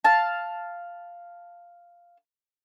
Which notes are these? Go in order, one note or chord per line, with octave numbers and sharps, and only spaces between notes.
F5 A5